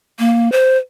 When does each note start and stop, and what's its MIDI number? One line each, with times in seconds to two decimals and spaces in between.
0.19 0.51 58
0.52 0.77 72